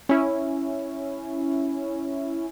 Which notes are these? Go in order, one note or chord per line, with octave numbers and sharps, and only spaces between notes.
C#4 E4